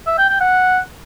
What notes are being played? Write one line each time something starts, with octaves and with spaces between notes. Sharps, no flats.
E5
G5
G5
F#5